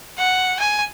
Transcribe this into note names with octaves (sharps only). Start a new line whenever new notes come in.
F#5
G#5